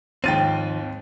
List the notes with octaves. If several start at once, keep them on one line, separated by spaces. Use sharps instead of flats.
D#2 G#2 D#3 F3 C4 G5 A6 D#7